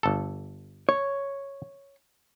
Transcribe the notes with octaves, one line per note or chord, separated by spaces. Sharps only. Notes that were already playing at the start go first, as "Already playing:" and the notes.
G1 A4
C#5